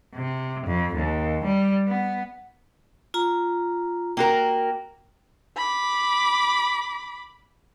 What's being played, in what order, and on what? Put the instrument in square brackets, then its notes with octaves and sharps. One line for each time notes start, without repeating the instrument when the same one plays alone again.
[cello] C3
F2
D#2
G3
B3
[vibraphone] F4 A#5
[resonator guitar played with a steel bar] A#3 F#4 A#4 [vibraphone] G5
[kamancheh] B5 D6